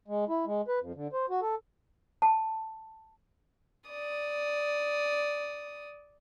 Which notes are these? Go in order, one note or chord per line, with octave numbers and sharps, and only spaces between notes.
G#3
E4
G#3
B4
F2
D3
C5
F#4
A4
A5
D5 D#6